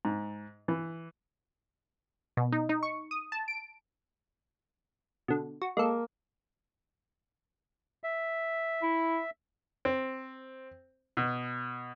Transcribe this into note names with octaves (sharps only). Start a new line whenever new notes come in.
G#2
E3
B2
D#4
D#4
C#6
D#6
A5
D7
B2 D3
F#4
G#3 A#3 A4
E5
E4
C4
B2